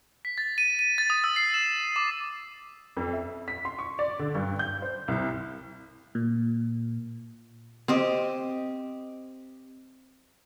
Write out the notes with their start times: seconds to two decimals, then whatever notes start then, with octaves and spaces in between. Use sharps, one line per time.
0.25 B6
0.38 A6
0.58 D#7
0.79 D#7
0.98 A6
1.10 D#6
1.24 E6
1.36 C7
1.54 E7
1.96 D6
2.97 F2
3.13 E5
3.48 B6
3.65 C6
3.78 C#6
3.99 D5
4.19 D3
4.35 G2
4.59 G6
4.82 C5
5.08 C2
6.15 A#2
7.88 C4 G4 D#5